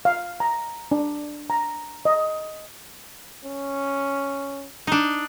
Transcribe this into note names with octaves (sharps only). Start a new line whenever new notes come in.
F5
A#5
D4
A#5
D#5
C#4
D4 D#4